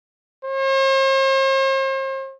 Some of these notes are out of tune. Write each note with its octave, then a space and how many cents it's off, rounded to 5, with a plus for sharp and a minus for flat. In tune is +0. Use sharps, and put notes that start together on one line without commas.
C5 +45